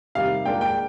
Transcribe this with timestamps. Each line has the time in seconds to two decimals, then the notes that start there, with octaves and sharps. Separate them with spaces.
0.15 C3 D#3 G3 F5
0.45 A#2 G#3 D4 F4 A#4 G5
0.61 G5